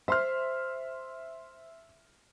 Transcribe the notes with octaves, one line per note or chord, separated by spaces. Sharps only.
C5 E5 C6 F6